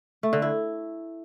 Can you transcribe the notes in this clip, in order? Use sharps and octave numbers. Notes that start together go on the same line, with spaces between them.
A3
D3
E4